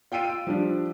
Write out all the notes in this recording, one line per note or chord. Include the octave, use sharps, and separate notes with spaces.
F4 G5 E6 D7 D#7
E6
F3 G3 D4